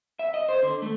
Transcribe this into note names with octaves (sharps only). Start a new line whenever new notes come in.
E5
D#5
C5
D3
A3